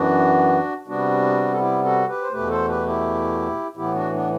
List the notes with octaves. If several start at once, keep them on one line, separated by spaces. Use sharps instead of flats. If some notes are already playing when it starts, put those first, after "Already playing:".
Already playing: F#2 E3 B3 D4 F#4
C3 G3 B3 D4 F#4
A4
E4 G4
F#4 A4
G4 B4
C5
E2 B2 A3 G4 B4
A4 C5
G4 B4
E4 G4
A2 E3 B3 E4 G4
D4 F#4
B3 D4